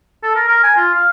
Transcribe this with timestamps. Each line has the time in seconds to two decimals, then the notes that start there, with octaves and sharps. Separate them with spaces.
0.23 A4
0.35 A#4
0.48 A#4
0.63 G#5
0.76 F4
0.94 F5